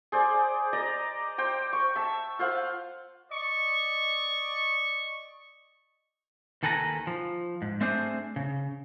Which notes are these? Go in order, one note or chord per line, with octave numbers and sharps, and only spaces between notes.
G#4 C5 D5
D5 D#5 A#5
C5 G5
C#6
E5 A5
F4 C5 F5 F#5
D5 D#5 C#6
D#2 D#3 A4 B4 G#5 A#5
F3
G#2
A3 C4 D4 G#4 C5 D5
C#3